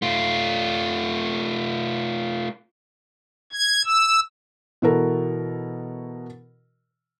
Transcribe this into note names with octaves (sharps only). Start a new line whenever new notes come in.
A3 F4
G#6
E6
B2 E3 F#4 A4 A#4